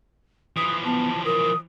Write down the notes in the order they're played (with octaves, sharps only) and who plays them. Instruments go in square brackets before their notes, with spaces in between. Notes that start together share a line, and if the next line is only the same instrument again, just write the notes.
[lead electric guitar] E3 F3 [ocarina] D#6
[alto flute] B3 [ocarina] A5
[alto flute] A#4 [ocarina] D#6